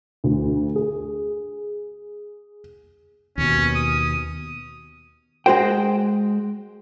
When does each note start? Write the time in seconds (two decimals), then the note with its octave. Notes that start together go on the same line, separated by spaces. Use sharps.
0.24 D2
0.75 G#4
3.38 D#2 B2 C#4
3.75 D#6
5.46 G#3 F#4 C5 G5